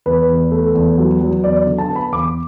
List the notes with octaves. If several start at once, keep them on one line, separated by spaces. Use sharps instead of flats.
E2 B4
E2
A3
E2
F#3
F#3
E2 D5
D3
A5
B3
B5
E2 D6